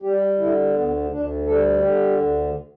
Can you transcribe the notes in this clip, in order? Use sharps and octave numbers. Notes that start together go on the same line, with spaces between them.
G3 G4
D3 E4
D2 B3
D2 D4
G3 A4
D3 G4
D2